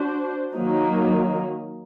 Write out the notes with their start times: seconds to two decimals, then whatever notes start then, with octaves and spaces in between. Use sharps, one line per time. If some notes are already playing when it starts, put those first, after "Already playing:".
Already playing: D4 F#4 C5
0.53 D#3 F#3 A#3 D#4